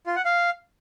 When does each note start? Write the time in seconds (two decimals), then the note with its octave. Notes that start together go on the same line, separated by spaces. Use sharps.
0.06 F4
0.16 F#5
0.25 F5